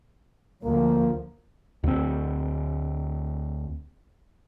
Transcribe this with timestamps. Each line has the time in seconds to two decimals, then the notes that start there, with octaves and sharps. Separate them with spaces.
0.64 D2 F3 A#3
1.84 D2 C4